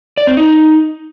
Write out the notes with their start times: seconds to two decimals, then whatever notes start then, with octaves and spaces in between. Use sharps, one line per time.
0.17 D5
0.27 C4
0.37 D#4